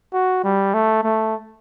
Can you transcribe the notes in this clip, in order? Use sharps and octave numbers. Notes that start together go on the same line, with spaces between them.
F#4
G3
A3
A3